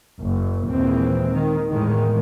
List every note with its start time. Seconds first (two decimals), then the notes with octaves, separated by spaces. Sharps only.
0.19 F#1
0.69 D#2 A#2 E3 G#3 C4
1.30 D#3
1.69 E2 A2 D#3 G#3